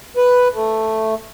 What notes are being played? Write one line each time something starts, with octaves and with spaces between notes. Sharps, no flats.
B4
A3